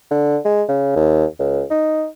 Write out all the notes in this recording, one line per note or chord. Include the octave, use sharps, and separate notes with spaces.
D3
G#3
C#3
D#2
C#2
D#4